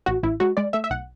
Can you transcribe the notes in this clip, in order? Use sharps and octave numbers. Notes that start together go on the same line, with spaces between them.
A1 F#4
A1 E4
G#3 F#4
G#3 D5
A3 E5
E5
B1 F#5